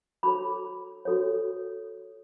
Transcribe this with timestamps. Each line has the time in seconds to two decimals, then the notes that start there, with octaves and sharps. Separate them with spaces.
0.23 F#4 A4 C#5 B5 D6
1.05 F#4 A4 C#5